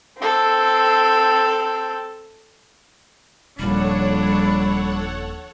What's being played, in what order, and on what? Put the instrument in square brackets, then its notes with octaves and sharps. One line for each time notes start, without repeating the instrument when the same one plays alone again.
[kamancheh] C4 A4
[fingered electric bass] D#1 A#2 [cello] F3 D4 [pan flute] G3 [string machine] A4 C#5 F#5